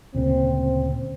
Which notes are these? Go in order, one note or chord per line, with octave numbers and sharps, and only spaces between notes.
D2 A#2 C#3 C4